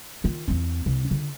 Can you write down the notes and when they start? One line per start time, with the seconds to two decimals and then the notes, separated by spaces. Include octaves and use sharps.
0.24 D#3 F4
0.48 E2 C4
0.86 C2
1.11 D3 F4